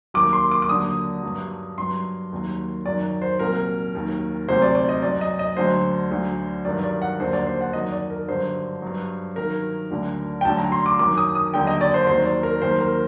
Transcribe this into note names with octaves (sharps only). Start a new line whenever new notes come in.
D#2 D#3 F#3 D6
C6
D6
D6
D#2 D3 F#3 D#6
G2 F#3
G2 F#3 C6
D#2 D#3 F#3
F#2 D#3 F#3 D5
C5
C2 A#2 F#3 A#4
D#2 D#3 F#3
D2 C3 F#3 C5
D5
D5
D#5
F#2 F#3 D5
D#5
D#5
D2 D3 F#3 C5
D2 D3 F#3
G2 D#3 F#3 D5
D5
F#5
D#2 D3 F#3 C5
D5
C5
F#5
F#2 D#3 F#3 D#5
D5
A#4
G2 D3 F#3 C5
G2 F#3
G2 D#3 F#3 A#4
D2 D3 F#3
G5
D2 D3 F#3 A5
A#5
C6
D6
F#2 D#3 F#3 D6
D#6
D#6
D#2 D3 F#3 G5
D#5
D5
C5
D#2 D#3 F#3 C5
D5
A#4
D#2 D#3 F#3 C5
A#4